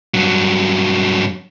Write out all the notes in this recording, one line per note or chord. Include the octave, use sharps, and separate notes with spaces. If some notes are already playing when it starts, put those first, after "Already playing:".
G2 F#3